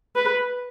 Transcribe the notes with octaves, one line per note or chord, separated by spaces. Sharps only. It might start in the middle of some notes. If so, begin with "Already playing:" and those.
B4